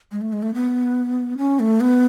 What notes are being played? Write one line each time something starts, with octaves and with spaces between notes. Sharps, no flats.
G#3
A3
G#3
A3
B3
C#4
A3
B3